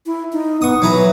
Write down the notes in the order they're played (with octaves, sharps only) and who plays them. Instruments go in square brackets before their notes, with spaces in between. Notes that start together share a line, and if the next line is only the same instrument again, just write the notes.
[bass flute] E4
D#4
[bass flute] B3 [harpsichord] C#6 D#6
[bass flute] E3 [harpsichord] F#3 B4 A#5